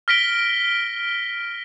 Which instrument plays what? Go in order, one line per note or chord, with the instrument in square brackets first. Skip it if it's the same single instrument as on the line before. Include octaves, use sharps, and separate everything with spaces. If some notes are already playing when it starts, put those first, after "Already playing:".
[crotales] F6 A#6 B6 D7 G7